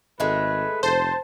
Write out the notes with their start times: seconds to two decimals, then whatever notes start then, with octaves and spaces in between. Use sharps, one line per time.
0.20 G#1 G#3 A3 B4
0.83 F1 C5 A5